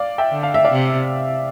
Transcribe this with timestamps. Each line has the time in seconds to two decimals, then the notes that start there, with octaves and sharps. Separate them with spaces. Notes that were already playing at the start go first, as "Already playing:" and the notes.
Already playing: D5 F5
0.18 E5 G5
0.31 D3
0.43 F5
0.54 E5
0.65 D5 F5
0.70 C3